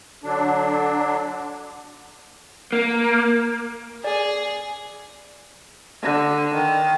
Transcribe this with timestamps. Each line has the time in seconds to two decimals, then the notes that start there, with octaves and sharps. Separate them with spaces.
0.24 D3 F#3 D4
2.73 A#3
4.04 G#4 D5
6.02 D3
6.54 D#3